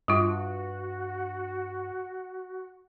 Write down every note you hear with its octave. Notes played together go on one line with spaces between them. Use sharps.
G2 G3 F4 F#4